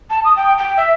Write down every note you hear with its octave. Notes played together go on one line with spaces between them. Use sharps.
A5
D#6
G5
G5
E5